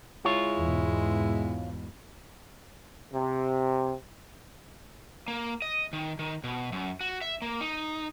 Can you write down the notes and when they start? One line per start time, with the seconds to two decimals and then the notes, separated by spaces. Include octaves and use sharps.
0.25 G#3 E4 F4 C#5
0.57 E2 G#2 B2
3.14 C3
5.28 A#3
5.62 D#5
5.93 D#3
6.19 D#3
6.44 B2
6.72 F#2
7.01 F#4
7.22 E5
7.42 A#3
7.61 D#4